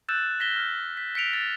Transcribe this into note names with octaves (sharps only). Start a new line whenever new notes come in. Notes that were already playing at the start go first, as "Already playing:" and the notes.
E6 F#6 G6 A6 E7
A#6 B6 E7 G7
F6 G6
B6
B6 C#7 D7 F7
A6